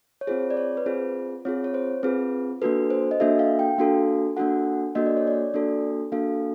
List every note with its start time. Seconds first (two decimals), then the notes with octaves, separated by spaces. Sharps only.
0.21 C#5
0.27 C4 F4 G#4 C5
0.50 D5
0.57 C#5
0.77 B4
0.86 C4 F4 G#4 C5
1.45 C4 F4 G#4 C#5
1.64 C#5
1.74 C5
2.03 C4 F4 G#4 B4
2.62 A#3 D4 F#4 A4 B4
2.90 C5
3.11 D#5
3.20 A#3 D4 F#4 A4 E5
3.39 F5
3.59 G5
3.78 A#3 D4 F#4 A4 F5
4.37 A#3 D4 F#4 A4 F#5
4.95 A#3 D4 F#4 A4 D#5
5.06 D5
5.17 C#5
5.27 D5
5.54 A#3 D4 F#4 A4
6.12 A#3 D4 F#4 A4 F5